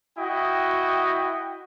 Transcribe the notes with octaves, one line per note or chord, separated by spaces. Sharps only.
E4 F#4 D#5 G5